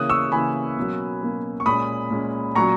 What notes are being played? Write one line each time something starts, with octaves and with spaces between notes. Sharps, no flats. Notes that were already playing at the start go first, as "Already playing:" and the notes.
Already playing: C#3 E3 A#3 C#4 D#6 F#6
C#6 E6
C#3 E3 A#3 C#4 G#5 B5
B2 F#3 A#3 C#4
B2 F#3 A#3 C#4
C#6
A#2 G#3 C#4 B5 D#6
A#2 G#3 C#4
A#2 F#3 C#4 A#5 C#6